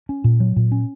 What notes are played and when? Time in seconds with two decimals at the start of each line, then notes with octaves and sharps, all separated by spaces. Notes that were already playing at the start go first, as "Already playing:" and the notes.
0.09 C#4
0.24 A#2
0.40 F#3
0.56 A#2
0.72 C#4